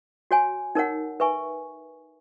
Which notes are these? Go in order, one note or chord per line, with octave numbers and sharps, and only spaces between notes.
F#4 C#5 G#5
D#4 A#4 C#5 F#5
B4 E5 G#5 C#6